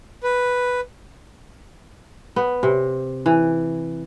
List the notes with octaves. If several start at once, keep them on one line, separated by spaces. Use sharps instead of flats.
B4
B3
C3
E3